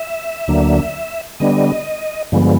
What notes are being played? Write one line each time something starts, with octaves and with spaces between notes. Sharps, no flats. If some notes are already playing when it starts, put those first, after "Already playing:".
Already playing: E5
D2 D3 F#3 A#3 D4
D3 G3 B3 D4 D#5
G2 D3 F3 G#3 B3